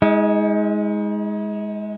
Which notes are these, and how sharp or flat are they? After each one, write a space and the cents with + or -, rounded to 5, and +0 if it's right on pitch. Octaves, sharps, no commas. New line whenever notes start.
G#3 +0 D#4 +40